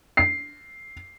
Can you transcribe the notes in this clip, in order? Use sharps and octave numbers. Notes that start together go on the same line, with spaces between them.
C7